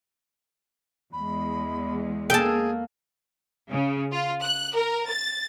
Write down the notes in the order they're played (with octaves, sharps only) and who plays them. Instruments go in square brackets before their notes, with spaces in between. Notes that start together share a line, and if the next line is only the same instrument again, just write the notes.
[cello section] E2 G#3 [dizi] B5
[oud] A#3 C#4 A4 [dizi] G#4 [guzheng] G5 A5
[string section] C#3
F4
F#6
A#4
A6